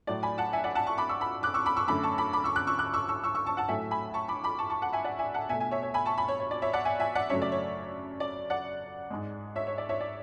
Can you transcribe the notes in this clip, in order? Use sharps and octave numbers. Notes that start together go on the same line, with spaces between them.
A2 F#3 A3 D5
G#5 B5
F#5 A5
E5 G#5
D5 F#5
F#5 A5
A5 C#6
B5 D6
C#6 E6
B5 D6
D6 F#6
C#6 E6
B5 D6
C#6 E6
F#2 D3 A3 B5 D6
A5 C#6
B5 D6
B5 D6
C#6 E6
D6 F#6
C#6 E6
D6 F#6
C#6 E6
C#6 E6
C#6 E6
C#6 E6
A5 C#6
F#5 A5
A2 F#3 A3 E5 G#5
G#5 B5
A5 C#6
B5 D6
B5 D6
A5 C#6
A5 C#6
F#5 A5
E5 G#5
D5 F#5
E5 G#5
F#5 A5
B2 A3 E5 G#5
E5 G#5
C#5 E5
C#5
G#5 B5
A5 C#6
G#5 B5
C#5
C#5
D5
C#5 E5
D5 F#5
E5 G#5
E5 G#5
D5 F#5
F#2 C#3 F#3 A3 C#5 E5
D5
C#5
D5
D5 F#5
G#2 G#3
C#5 E5
C#5
D5
C#5 E5
D5